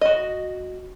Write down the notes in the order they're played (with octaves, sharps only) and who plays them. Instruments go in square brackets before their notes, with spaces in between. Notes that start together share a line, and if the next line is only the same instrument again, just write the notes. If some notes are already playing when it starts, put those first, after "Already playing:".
[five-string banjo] F#4 D#5